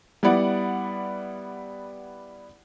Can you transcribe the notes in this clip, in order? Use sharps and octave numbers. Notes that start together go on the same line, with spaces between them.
G3 B3 E4 D5 F#5